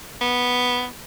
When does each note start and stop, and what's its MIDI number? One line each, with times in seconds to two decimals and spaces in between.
0.21 0.87 59